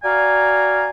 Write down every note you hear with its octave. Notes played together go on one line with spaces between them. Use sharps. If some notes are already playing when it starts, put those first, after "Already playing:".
F#4 D5 F5 G#5 A#5